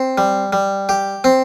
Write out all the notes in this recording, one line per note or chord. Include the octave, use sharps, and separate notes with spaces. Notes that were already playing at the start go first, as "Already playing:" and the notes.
Already playing: C4
G3
G3
G4
C4